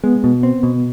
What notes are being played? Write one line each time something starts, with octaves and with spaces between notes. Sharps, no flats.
G#3 B3
B2
C4
B2